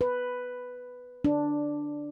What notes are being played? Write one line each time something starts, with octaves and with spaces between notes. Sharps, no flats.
B4
D4